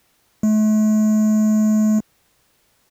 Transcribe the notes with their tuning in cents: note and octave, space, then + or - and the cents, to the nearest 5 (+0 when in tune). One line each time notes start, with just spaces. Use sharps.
A3 -40